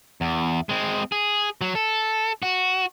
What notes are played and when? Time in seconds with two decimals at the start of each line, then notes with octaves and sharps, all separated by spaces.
0.21 E2
0.69 G#3 C4
1.12 G#4
1.61 F#3
1.75 A4
2.42 F#4